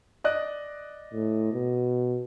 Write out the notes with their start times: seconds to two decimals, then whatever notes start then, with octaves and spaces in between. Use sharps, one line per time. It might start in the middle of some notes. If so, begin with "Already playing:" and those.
0.24 D5 D#5 F#6
1.13 A2
1.53 B2